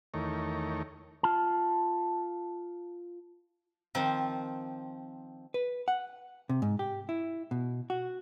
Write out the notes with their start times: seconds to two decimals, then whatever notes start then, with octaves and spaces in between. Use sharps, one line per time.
0.14 E2 D#3 A3 A#4 C#5
1.23 F4 A5
3.95 D#3 F3 C4
5.54 B4
5.88 F#5
6.49 C3
6.62 G#2
6.79 G4
7.09 E4
7.51 B2
7.90 F#4